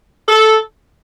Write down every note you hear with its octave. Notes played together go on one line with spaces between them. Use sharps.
A4